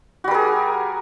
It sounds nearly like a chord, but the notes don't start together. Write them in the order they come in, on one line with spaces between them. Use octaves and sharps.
F#4 G3 A#4 G#4